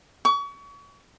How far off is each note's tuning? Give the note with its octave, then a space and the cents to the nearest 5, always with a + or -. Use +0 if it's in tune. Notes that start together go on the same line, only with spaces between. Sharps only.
C#6 +35